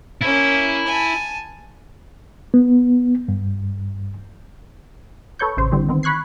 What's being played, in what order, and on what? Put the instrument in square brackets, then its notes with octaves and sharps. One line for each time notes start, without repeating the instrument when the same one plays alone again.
[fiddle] A#3 C#4 [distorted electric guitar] E4
[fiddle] G#5 A5
[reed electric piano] B3
G2
[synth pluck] A4 B4 C#5 C#6 G6
A1 C#3 C5
D3 E3 G3 C4
D#3 B3 C4
B5 C#6 F#6 G#6 C7